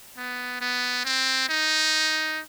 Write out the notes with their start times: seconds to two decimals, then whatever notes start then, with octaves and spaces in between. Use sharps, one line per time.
0.17 B3
0.61 B3
1.05 C4
1.49 D#4